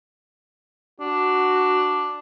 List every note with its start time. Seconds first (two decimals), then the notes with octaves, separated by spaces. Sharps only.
1.00 D4 F#4